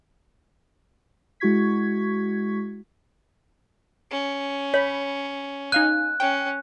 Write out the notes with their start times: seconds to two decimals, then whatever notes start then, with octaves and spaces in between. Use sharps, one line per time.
1.40 G#3 E4 F#4 C#6 G#6 B6
4.11 C#4
4.74 C#5 B5
5.72 D#4 F5 G#5 F#6
6.20 C#4 G5